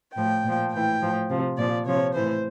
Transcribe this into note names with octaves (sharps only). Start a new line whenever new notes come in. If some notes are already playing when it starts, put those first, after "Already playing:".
A2 F3 G5
A#2 F3
A2 E3 G5
A2 F3
C3 F3
A#2 F3 D5
C3 F3 C#5
A2 E3 C5